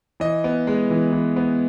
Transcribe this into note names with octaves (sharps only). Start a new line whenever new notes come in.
E3 D#5
B3
G#3
E3
E3
B3